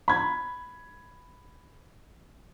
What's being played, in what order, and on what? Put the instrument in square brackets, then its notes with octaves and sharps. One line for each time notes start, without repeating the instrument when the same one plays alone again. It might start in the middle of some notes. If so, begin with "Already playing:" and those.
[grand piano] B5 G#6